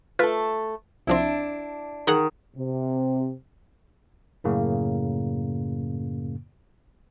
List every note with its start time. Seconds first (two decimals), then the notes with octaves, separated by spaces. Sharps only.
0.19 A3 F4 A4 B4
1.07 C2 F3 C4 D4 E4
2.07 D#3 G#4 F#5 A#5
2.56 C3
4.44 F#2 A2 C#3 A#3